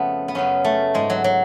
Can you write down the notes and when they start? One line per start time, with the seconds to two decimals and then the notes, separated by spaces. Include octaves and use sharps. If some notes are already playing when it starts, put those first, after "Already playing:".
Already playing: F2 C#3 A3 B3
0.28 B3
0.35 F#2 C#3 C#4
0.64 A3
0.94 G#2 G#3
1.10 F#3
1.24 F#3